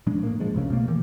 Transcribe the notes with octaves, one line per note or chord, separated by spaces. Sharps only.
A#2 F3 G#3 D4
A2 A#3
F3 G#3
F1 C2 C#3
B2 A3 A#3
D#3 E3